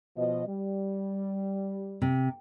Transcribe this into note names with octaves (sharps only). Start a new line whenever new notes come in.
B2 F3 D#5
G3
C3